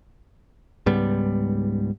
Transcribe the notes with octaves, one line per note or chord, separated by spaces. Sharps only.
C#2 G#2 G3 B3